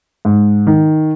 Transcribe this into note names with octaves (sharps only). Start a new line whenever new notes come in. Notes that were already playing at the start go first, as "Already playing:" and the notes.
G#2
D#3